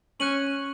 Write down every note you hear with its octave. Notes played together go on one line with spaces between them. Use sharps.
C#4 F#6 D#7 F#7